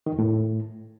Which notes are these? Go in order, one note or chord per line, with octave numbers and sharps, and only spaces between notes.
D#3
E2
A2